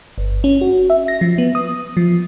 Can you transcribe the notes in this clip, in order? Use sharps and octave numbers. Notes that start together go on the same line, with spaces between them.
G1
C#4
F#4
E5
A#6
F3
B3
D#6
F3